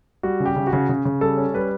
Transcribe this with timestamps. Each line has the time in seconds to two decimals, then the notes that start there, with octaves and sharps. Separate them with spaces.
0.23 G3 F#4
0.40 C#3
0.46 G4
0.56 C#3
0.67 F#4
0.73 C#3
0.89 C#3
1.05 C#3
1.21 G3 A4
1.37 C#4
1.54 G3 B4